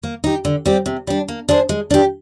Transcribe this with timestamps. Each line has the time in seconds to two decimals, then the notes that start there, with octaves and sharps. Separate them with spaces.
0.03 A#3
0.24 D#4 G4
0.45 D3
0.66 G3 C4 G4
0.86 C3
1.07 G3 D4
1.28 A#3
1.49 D4 G#4 C5
1.69 G#3
1.91 D4 G4